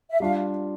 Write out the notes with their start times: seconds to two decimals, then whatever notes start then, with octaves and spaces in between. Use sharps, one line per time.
0.10 E5
0.20 G3 D4 F4 F5